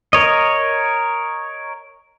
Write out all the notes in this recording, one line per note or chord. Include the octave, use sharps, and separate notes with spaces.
A#4 C#5 D#5